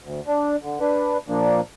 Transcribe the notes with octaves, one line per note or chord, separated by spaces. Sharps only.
D2
D4
D3
D4 B4
A#2 F3 A#3 D4